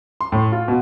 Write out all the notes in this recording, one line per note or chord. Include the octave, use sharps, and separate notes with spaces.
C6
A2
F4
B2